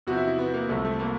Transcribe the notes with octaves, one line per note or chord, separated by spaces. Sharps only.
E2 C3 F3 F#4
E4
E4
B3
A#3
C2 C3 F3 A3
A3
A#3